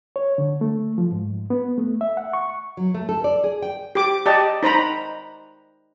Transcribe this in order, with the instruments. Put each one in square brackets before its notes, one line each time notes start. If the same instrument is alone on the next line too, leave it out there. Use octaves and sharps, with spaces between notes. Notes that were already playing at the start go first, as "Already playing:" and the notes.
[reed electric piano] C#5
D3
A3
F3
G#2
B3
A3
E5
F#5
C#6
[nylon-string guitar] F#3
A3
A4
D5
G#4
G5
[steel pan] G4 D6
G4 D5 D#5 A5
D#4 C5 A#5 B5